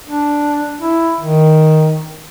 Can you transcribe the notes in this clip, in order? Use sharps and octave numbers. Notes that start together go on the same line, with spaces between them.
D4
E4
D#3